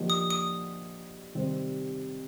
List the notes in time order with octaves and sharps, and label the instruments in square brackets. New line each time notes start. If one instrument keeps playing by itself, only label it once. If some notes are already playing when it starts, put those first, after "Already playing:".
Already playing: [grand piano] D3 F3 A#3 D#4 G4
[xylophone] D#6
D#6
[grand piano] C3 D#3 G3 C4